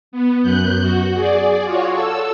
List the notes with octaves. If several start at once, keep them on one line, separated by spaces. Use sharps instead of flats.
B3
F#2 F#6 G6
F#4
G#4 D5
F4 F#4 C#5
A4 E6